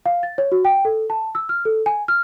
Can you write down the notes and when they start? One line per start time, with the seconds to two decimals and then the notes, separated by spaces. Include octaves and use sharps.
0.06 F5
0.23 A6
0.38 C#5
0.52 F#4
0.65 G5
0.85 A4
1.10 A5
1.35 E6
1.49 F6
1.65 A4
1.86 G#5
2.08 F6